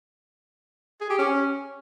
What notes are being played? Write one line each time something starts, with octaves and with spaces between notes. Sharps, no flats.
G#4
G4
C#4